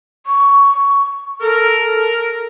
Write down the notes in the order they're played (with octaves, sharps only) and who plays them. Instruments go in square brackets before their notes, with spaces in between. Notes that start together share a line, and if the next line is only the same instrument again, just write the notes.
[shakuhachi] C#6
[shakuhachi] A4 [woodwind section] A#4